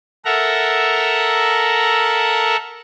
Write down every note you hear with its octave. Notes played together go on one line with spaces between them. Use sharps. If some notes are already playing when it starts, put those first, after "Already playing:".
A4 A#4 E5 F#5 A#5